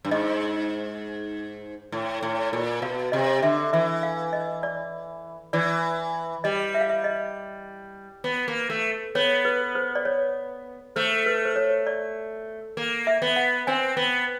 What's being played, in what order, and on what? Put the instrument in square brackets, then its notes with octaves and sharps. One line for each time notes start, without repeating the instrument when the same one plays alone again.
[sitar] G2
[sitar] G#2 [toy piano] D#5
[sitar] A2
A2
A#2
[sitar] B2 [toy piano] F5
[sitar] C3 [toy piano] D#5
[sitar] D3 [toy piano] E5
[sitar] E3 [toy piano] E5
[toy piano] F5
D#5
D5
[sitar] E3 [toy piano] D5
[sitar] G3 [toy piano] D#5
[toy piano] E5
F5
E5
D#5
[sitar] B3
A#3
A3
[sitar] B3 [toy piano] C#5
[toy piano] B4
C5
D5
C#5
[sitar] A3 [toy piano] C5
[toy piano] B4
C5
C#5
D5
[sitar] A#3
[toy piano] E5
[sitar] B3
[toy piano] F#5
[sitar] C4 [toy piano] G#5
[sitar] B3